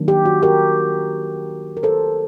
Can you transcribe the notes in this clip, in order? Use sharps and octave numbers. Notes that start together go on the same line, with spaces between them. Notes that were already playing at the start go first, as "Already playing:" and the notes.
Already playing: D#3 F#3 A#3 D4
G4
F#4
G4 A#4
A#4
A4 C5